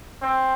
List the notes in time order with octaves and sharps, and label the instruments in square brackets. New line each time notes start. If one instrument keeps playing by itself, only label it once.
[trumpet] C4